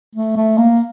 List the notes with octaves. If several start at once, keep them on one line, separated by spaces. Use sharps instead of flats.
A3
A3
A#3